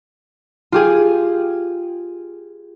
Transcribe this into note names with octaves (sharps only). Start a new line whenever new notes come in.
F4 G4 G#4